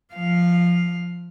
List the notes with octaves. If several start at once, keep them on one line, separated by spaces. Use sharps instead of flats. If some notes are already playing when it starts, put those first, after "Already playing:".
F3 F5